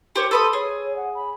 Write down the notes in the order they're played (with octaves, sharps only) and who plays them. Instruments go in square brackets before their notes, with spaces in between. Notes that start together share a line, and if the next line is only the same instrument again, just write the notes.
[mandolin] G4 C5 C#5 [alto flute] A#4
[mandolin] A4 B4 D#6 [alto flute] C6
[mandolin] G#4 [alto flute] C#5
[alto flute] F#5
B5